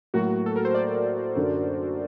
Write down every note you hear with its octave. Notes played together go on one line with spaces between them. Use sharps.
A2 F#3 A#3 F#4
A4
A#4
C5
D5
F#2 D3 F#3